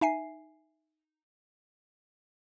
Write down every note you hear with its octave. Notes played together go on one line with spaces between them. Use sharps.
D#4 E5 G#5 C7